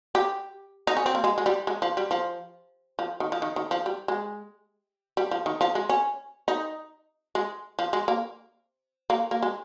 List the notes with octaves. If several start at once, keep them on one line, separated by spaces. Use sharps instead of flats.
G4
D#4
C#4
C4
A#3
G#3
G#3
G3
G#3
F3
G3
F3
F3
D#3
F3
D#3
D#3
F3
G3
G#3
G3
F3
D#3
F3
G#3
C#4
D#4
G#3
F3
G#3
A#3
A#3
A#3
G#3